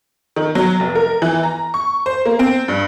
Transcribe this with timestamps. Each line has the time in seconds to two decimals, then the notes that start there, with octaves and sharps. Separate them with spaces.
0.36 D#3
0.55 F#3
0.80 F1
0.95 A#4
1.22 E3
1.43 A#5
1.74 C#6
2.06 C5
2.26 A#3
2.39 C4
2.68 G2